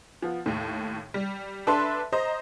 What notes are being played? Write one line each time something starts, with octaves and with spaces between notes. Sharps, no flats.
F3 B3
D#2 A2
G3
D4 A4 B4 E5 A5 C6
C5 D#5 A#5